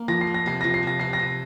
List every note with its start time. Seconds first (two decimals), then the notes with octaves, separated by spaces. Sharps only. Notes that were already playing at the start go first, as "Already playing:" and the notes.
Already playing: A#3
0.08 F3 A#6
0.21 C7
0.27 A#3
0.34 A#6
0.46 C3 C7
0.61 F3 A#6
0.74 C7
0.83 C3 A#6
0.99 C3 C7
1.13 A#6
1.19 C3